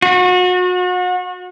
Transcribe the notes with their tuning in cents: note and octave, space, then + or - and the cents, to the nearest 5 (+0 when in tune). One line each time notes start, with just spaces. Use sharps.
F#4 -35